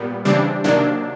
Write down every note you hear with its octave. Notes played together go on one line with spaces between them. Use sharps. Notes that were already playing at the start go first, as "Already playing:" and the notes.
Already playing: A#2 G3 B3
C#3 E3 G3 C4 D4
C3 D#3 F#3 A#3 D4